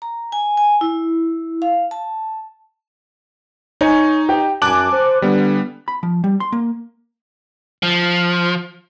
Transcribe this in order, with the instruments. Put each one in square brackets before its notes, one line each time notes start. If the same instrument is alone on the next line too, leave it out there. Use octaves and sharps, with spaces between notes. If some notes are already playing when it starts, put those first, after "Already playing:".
[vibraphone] A#5
G#5
G#5
E4
F5
A5
[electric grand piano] D#4 [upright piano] C#5 G#5 C#6
[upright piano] G4
[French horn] F#2 [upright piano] G#5 F#7 [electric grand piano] A5 D6 F#6
[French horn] C5
[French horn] D3 [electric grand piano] G3 B3
[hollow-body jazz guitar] B5
F3
G3
C6
A#3
[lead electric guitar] F3